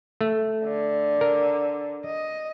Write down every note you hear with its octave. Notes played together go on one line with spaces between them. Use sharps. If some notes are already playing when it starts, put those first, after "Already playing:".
A3
D3
A#4
D#5